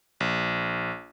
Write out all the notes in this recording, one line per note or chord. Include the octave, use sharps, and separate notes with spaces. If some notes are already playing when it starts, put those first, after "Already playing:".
A#1